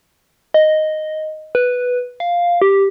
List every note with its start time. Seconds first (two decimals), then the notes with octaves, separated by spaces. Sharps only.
0.54 D#5
1.55 B4
2.20 F5
2.62 G4